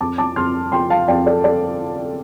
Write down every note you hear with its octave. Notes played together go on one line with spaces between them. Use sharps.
F2 A5 D6
A5 D6
F2 C6 F6
F3 G5 C6
F5 A5
F2 D5 G5
A4 D5
A4 D5